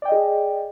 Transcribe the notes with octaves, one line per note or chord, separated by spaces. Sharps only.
G#4 D5 D#5 G5